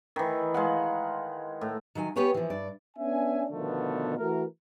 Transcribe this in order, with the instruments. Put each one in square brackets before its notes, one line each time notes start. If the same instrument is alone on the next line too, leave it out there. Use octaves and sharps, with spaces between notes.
[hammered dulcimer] D#3 E3
G#3 F5 F#5
A2
[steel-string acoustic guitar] D#3 F#3 G5 G#5
B3 G4 B4 C#5 G5 G#5
E3 F3
G2 D5
[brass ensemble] B3 C#4 D4 E5 G#5
B2 D3 D#3 F3 A3 B3
E3 A3 F#4 A#4